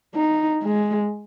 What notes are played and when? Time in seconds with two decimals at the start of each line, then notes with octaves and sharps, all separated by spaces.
0.15 D#4
0.63 G#3